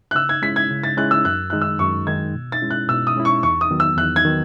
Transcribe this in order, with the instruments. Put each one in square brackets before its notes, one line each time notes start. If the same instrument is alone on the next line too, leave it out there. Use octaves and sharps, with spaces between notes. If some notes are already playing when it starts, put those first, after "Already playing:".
[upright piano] F#6
[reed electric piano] C#3 [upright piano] E6
[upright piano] G#6
[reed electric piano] G#3 C#4 E4 [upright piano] B6
[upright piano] G#6
[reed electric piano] C#3
[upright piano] A6
[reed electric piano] G#3 C#4 E4 [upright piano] F#6
[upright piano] E6
[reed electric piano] F#2 [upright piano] F#6
[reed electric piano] D#3 G#3 D#4 [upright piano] F#6
[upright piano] E6
[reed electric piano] F#2 [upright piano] C#6
[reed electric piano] D#3 G#3 D#4 [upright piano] G#6
[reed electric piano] B2
[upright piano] A6
[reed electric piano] G#3 C#4 E4
[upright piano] F#6
[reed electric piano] B2 [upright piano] E6
[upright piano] D#6
[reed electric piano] G#3 C#4 E4
[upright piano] C#6
[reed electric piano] E2 [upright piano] C#6
[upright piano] D#6
[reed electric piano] D#3 F#3 B3
[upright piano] E6
[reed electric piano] E2 [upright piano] F#6
[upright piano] G#6
[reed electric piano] D#3 F#3 B3